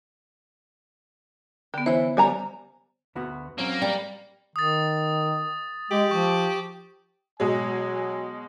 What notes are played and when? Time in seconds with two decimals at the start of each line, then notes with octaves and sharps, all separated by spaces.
1.74 D3 B3 G4
1.86 E3 E4 C5 C#5
2.17 G3 G#5 A#5
3.15 D2 B3 F#4
3.58 F#3 A#3 C4 C#4
3.82 G3
4.56 D#3 D#6 A6
5.91 G#3 G4 F#7
6.11 F3 C#6
7.40 B2 F#3 G#3 G#5